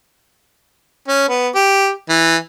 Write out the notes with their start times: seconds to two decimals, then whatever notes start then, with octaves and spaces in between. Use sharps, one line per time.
1.08 C#4
1.29 B3
1.55 G4
2.09 E3